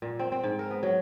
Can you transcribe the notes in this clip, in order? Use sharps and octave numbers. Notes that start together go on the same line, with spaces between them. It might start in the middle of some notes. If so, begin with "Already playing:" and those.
A#2
C4
C4
G#2
A#4
B3
F#3